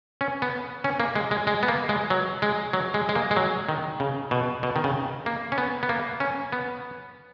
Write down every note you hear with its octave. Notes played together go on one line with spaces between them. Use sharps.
C#4
B3
C#4
A#3
G#3
G#3
G#3
B3
A#3
G#3
F#3
G#3
F#3
G#3
G#3
A#3
G#3
F#3
D#3
C#3
B2
B2
D#3
C#3
A#3
C#4
B3
B3
A#3
C#4
B3